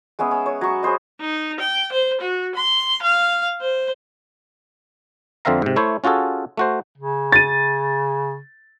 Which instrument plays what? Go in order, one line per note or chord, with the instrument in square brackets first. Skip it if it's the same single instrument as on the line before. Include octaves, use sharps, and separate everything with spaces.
[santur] G#3 B3 C#4 E5
C#4
C#5
F#3 C#6
G#4 B4 C5 D#5
[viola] D#4
G5
C5
F#4
C6
F5
C5
[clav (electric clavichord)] F2 D3 C4 E5 F5 A#5
G#2 C3
A3 E4 C5 C#5
C#4 F4 F#4 G#4 A4
A3 F#4 C5
[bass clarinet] C#3
[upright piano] A6 D#7